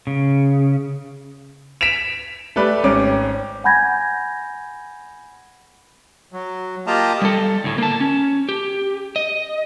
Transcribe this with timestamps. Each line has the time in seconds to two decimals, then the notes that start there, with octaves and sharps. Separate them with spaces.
0.07 C#3
1.81 B6 D7 E7 F7
2.56 A3 G4 B4 D5
2.84 G#1 C#4 D6
3.64 F#5 G#5 B5 G6 G#6 A#6
6.32 F#3
6.87 A#3 F4 G4 D#5 A5 A#5
7.22 G3 A4
7.64 D2 A2
7.78 A#3 A5
8.00 C#4
8.49 G4
9.16 D#5